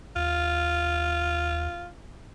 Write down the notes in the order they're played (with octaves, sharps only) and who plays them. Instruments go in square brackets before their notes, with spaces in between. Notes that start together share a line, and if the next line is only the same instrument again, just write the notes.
[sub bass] D#2 [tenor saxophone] F4